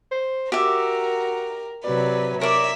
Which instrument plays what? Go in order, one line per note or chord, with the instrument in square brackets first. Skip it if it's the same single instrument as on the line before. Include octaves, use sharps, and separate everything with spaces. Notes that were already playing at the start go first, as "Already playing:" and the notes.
[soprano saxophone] C5
[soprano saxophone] F#4 [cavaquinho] G4 E5 [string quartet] A#4
[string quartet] C3 F#3 B4 [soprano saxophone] D5
[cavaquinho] A#4 D5 [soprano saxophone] C#5 [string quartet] E5